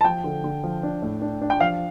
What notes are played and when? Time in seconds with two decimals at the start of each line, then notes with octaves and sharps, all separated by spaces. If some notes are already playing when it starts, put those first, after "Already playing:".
0.01 A5
0.04 F3 G5
0.24 D3
0.44 D3
0.63 F3
0.83 D4
1.02 A2
1.22 D4
1.41 D4
1.50 G5
1.60 F3 F5